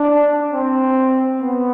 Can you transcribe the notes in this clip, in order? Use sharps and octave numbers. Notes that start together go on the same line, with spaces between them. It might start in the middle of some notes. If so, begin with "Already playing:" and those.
Already playing: D4
C4
B3